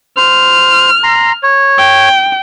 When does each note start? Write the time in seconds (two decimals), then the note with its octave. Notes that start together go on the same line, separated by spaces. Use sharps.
0.17 C5 F6
1.04 A#5 C6
1.43 C#5
1.78 G5